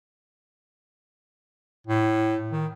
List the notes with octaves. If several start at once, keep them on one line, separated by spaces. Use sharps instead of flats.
A2
D#3